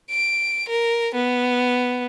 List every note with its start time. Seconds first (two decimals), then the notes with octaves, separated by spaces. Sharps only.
0.11 D7
0.69 A#4
1.14 B3